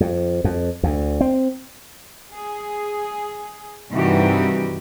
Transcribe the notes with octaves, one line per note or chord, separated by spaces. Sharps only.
F2
F2
D2
C4
G#4
G2 C3 D#3 E3 F#4 G4